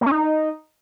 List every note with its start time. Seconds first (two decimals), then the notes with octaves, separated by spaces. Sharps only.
0.01 A#3
0.06 C#4
0.11 D#4